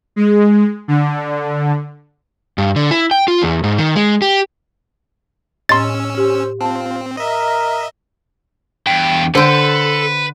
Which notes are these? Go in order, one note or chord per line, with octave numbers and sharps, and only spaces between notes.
G#3
D3
G2
D3
E4
G5
F4
E2
G#2
D#3
G#3
G4
A2 C#4 D#5 C6 E6 A6
G4 C5
C4 F4 A5
A#4 D#5 E5
E2 G2 G5
D3 A4 B4 C5 G5